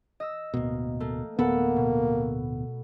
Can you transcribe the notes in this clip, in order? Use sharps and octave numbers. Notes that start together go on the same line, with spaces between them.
D#5 E6
D1 B2 A#3
A3 A#3
D1 A#3 B3 A4 B4 F#5
B2